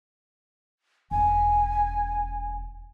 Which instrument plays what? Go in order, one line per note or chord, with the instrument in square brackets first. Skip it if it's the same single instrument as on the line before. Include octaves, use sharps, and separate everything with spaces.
[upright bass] E1 C#4 [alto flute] G#5